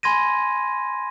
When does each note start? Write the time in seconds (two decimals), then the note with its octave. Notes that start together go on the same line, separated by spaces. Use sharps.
0.03 G#5 B5 C6 G#6 A#6 D#7